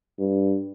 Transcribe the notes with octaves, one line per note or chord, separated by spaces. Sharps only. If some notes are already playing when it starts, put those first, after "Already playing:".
G2